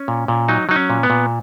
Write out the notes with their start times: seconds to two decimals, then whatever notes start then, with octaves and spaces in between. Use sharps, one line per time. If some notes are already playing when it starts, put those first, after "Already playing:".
Already playing: C#4
0.08 A#2
0.28 A#2
0.48 F#3 D#4
0.69 F#3 D#4
0.76 C#4
0.90 A#2
1.03 B3
1.10 A#2